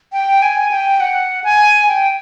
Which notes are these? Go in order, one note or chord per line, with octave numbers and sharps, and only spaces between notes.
G5
G#5
G5
F#5
G#5
G5